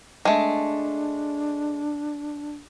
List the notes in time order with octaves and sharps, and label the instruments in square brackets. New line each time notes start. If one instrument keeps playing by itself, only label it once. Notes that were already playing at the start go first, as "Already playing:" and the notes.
[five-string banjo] G#3 A3 [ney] D4